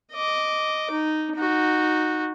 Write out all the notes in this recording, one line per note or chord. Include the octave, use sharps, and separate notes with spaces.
D#5 D6
D#4
D#4 F#4